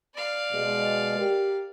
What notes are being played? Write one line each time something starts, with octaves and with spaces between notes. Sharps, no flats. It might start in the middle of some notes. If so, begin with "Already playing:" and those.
D5 F5
B2 G#3
G4 A#4